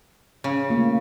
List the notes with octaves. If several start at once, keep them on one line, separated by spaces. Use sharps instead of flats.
C#3
A3 A#3 F4